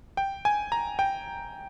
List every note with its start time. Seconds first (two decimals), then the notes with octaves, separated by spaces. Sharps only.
0.17 G5
0.45 G#5
0.72 A#5
0.99 G5